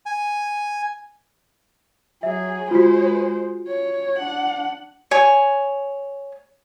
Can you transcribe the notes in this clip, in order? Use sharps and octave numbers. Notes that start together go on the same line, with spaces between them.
G#5
F#3 G#4 E5
G#3 F4 F#4 C5
C#5
D4 F#5
C#5 G#5